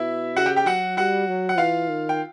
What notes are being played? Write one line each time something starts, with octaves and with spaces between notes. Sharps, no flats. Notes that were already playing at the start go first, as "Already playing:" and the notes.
Already playing: B2 E4 E5
C#3 F#4 F#5
G4 G5
G4 G5
F#3 F#4 F#5
G3 F#4 F#5
F#3
F#5
E3 F4 F5
D#3
G5